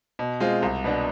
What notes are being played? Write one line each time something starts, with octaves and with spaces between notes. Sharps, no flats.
B2
G#3 C4 F4
C2
B2 B3 D4